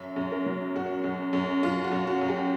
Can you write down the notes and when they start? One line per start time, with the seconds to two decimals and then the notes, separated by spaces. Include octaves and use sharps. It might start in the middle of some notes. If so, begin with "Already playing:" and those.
Already playing: F#2 E5
0.16 F#2
0.31 A#4
0.46 F#3
0.75 F#2 F#4
1.04 F#2
1.33 F#2
1.63 F#2 F4
1.84 F#4
1.92 F#2
2.07 F#4
2.21 F#2
2.28 G4